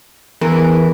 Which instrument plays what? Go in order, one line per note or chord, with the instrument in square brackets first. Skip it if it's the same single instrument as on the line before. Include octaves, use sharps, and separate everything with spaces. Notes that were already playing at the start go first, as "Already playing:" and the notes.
[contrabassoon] E2 [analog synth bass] E3 [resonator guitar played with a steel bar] A#4